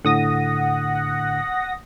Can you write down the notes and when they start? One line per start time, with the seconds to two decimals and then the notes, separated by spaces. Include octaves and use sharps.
0.05 A2 D3 F#5 D#6 A#6